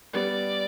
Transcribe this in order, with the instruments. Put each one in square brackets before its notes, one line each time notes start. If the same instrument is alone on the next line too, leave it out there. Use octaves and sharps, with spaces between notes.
[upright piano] G3 B3 [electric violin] D5